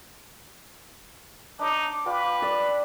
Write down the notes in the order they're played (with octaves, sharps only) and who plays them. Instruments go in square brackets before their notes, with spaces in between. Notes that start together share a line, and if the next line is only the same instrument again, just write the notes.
[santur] D4 C#5 [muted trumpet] D#4 [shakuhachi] D6
[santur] F4 D5 G5 [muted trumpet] B4
[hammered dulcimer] D5 [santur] E6